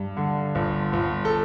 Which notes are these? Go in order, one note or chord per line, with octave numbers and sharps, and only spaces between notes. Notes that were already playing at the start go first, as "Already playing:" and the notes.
Already playing: G2
D3
G1
G1
A4